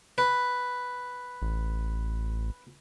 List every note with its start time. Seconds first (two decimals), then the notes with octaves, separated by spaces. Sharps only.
0.18 B4
1.42 A1